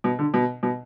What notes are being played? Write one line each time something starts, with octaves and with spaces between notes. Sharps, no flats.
B2
D3
B2
B2